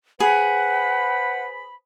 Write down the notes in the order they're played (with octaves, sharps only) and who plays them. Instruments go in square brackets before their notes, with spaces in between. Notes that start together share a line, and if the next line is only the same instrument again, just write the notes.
[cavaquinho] G#4 [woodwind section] B4 C5 B5 [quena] F#5